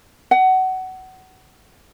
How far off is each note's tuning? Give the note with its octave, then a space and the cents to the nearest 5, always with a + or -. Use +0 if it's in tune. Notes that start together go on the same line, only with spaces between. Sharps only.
F#5 +20